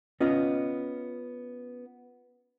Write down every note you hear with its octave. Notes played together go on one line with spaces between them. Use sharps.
B3 C#4 F4 D#5